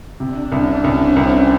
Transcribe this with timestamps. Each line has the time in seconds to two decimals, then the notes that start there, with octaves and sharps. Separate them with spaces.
0.20 C3 D4
0.52 C2 C#4
0.84 C2 C4
1.16 C2